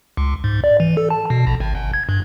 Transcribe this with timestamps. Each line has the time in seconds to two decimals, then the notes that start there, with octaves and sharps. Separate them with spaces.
0.17 C#2
0.44 G#2
0.64 D5
0.80 E3
0.97 A4
1.10 A5
1.30 B2
1.47 A#1
1.60 G#1
1.75 G1
1.94 G#6
2.09 G2